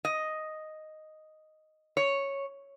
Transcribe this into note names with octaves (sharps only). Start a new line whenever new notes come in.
D#5
C#5